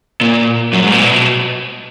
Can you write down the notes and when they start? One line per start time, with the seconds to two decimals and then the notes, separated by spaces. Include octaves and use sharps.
0.21 A#2
0.73 F#2
0.83 G#2
0.92 A#2
1.02 B2